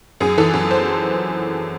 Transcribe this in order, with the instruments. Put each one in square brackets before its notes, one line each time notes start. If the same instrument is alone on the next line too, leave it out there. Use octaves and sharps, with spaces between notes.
[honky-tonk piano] F#2 G#4
E3 A4
F#2
C5